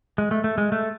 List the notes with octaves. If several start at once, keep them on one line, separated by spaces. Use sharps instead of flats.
G#3
A3
A3
G#3
A3